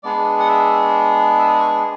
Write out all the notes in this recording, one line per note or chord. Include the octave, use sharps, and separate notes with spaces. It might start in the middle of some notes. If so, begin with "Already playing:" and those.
G#3 B3 D4 G#4 D5
F#5
E5
E5
C#6